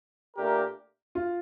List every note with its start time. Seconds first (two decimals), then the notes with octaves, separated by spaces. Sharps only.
0.36 A#2 A3 D4 G4 A#4
1.15 F4